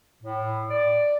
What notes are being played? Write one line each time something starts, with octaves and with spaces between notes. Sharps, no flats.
A2
D5